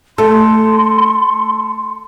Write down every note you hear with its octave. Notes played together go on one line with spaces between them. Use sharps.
A3 A4 C6